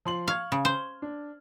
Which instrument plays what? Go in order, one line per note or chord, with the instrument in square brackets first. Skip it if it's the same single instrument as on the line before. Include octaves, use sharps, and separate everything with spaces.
[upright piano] F3 C6 F#7
[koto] F5 [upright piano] C#6 F6 G#6
[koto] C#3
C5
[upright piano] D4